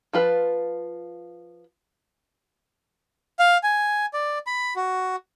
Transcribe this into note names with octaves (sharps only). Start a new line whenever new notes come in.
F3 F4 B4
F5
G#5
D5
B5
F#4